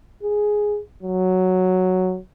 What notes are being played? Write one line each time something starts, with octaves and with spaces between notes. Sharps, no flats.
G#4
F#3